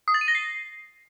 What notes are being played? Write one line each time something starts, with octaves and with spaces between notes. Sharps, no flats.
D#6
A6
D#7
A#6
C7